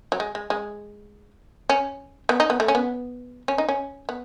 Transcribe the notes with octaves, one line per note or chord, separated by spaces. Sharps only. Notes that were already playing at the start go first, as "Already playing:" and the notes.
F#3
G#3
G#3
G#3
C#4
B3
D#4
B3
A3
C#4
B3
C#4
D#4
C#4
B3